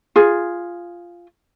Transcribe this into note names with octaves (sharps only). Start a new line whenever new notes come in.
F4 G#4